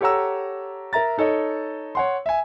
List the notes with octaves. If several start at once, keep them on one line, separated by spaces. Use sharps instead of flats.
G4 A4 C#5 F#5 A#5 E6
A#4 E5 A#5 A6
D#4 A4 C#5 D#5
C#5 F#5 C6
E5 G#5